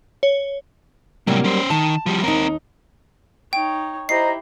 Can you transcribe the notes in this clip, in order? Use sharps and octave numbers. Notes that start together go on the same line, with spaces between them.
C#5
A2 C3 F#3 G3 A#3
C#4 C5
D#3 A5
F3 G3
D#2 C4 D#4 A#4
D#4 C#5 G5
E4 G4 C5 D#5 A#5 C7